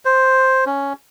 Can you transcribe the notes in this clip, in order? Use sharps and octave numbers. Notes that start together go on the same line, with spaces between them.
C5
C#4